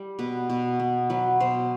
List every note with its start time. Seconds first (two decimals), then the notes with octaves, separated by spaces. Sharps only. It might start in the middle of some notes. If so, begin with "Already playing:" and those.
Already playing: G3
0.19 B2 B4
0.50 B2
0.79 B3
1.10 F#3 B4
1.40 B2 C5